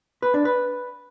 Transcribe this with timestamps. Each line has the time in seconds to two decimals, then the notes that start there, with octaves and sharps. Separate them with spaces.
0.22 B4
0.34 D4
0.45 B4